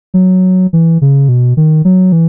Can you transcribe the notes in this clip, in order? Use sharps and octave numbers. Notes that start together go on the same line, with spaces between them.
F#3
E3
C#3
B2
D#3
F#3
E3